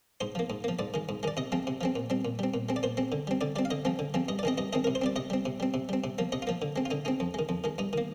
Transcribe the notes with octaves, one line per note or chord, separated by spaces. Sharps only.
G#2 C5
F3 A#3
G#2
F3 A#3
G#2 D5
D#3 G#3
G#2
D#3 G#3 D5
C3 D#5
F3 G#3 C4
C3
F3 G#3 C4
A#2
G3 C4
A#2
G3 C4
A#2
G#3 C4
D5
A#2 C5
G#3 C4
D3
G3 C4
D3 D5
G3 C4 D5
F5
D3 D#5
F3 G#3 C4
D3
F3 G#3 C4
G2 D#5
D5
D#3 G#3 C4 D#5
G2 D#5
D#3 G#3 C4 D#5
C3 A#4
C5
G3 C4 D5
C3 D#5
G3 C4
C3
G3 C4
C3
G3 C4
C3
F3 A#3
C3 D#5
F4
F3 A#3
D3
G#3 C4
F4
D3 D#4
G#3 C4 D#4
F2
D#3 G#3
F2
D#3 G#3
G2 D#4
D#3 A#3